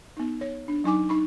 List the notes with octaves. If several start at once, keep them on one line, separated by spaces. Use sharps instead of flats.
B3 D#4
C#5
D4
F#3 D#4 G#5 D6
D#4 B5 C#6